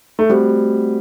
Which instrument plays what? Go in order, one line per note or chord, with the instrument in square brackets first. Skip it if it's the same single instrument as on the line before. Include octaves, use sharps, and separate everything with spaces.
[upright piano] A3
[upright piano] G3 [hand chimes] A3 C4 F#4 C5